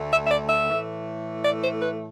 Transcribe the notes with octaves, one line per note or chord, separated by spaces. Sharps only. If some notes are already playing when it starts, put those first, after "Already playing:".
Already playing: D2 D3 A3
E5
E5
D5
E5
A2 E3 A3
D5
C5
B4